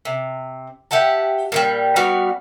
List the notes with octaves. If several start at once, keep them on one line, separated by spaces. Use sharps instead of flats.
C3
G4 E5 F#5 A5
A#2 E3 G3
G3 B3 F#4 F5